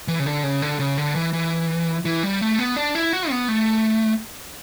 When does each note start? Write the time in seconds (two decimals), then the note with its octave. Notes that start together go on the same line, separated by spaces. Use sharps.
0.08 E3
0.20 C#3
0.26 D3
0.43 C#3
0.62 D3
0.80 C#3
0.98 D3
1.16 E3
1.33 E3
2.05 E3
2.23 G3
2.41 A3
2.59 B3
2.77 D4
2.95 E4
3.13 F#4
3.30 B3
3.48 A3